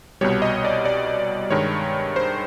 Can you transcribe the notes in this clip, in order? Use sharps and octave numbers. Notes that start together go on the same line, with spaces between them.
C2 B2 G3 C#5
D#5
D5
D5
G2 D#3 G#3 C#5
C5